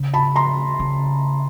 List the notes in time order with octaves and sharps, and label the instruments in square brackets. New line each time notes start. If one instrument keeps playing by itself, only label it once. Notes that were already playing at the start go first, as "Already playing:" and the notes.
Already playing: [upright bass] C#3
[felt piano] A5 B5
A#5 C6
[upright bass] C#3